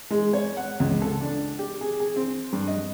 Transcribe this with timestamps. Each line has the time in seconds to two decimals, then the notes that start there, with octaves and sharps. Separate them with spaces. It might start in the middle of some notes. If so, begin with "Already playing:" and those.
0.10 G#3
0.33 C#5
0.57 F#5
0.80 C#2
1.02 A4
1.21 D4
1.59 G4
1.81 G#4
2.00 G#4
2.16 C4
2.53 G2
2.67 D#5